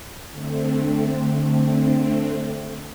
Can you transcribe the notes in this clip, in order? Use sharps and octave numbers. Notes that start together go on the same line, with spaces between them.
D3 A3 C4